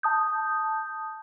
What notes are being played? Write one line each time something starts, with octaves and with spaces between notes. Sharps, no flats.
A5 D#6 G6